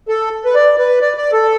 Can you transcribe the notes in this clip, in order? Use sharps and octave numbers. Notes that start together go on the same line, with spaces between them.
A4
B4
D5
B4
D5
D5
A4